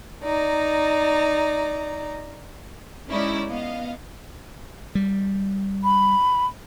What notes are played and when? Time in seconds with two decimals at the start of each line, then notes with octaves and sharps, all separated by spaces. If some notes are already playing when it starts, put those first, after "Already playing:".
0.24 D#4 D5 A#5
3.09 G#3 C#4 D#4 E4 D5
3.48 B3 D#5 F5
4.95 G3
5.84 B5